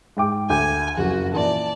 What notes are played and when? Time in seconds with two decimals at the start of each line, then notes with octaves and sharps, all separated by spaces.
0.17 G#2 G5 D6
0.50 D2 G#5 D6 G6
0.97 F#1 F2 F#4
1.34 A#2 E3 D5 A5